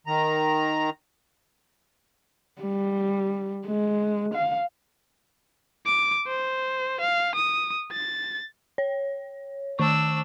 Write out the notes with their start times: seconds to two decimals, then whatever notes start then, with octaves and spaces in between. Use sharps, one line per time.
0.07 D#3 A#5
2.62 G3
3.66 G#3
4.34 F5
5.87 D6
6.28 C5
7.01 F5
7.35 D#6
7.92 A6
8.78 C#5
9.79 D#3 D4 C#6 E6